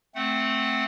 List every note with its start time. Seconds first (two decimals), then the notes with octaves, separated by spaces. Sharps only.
0.15 A3 C4 F#5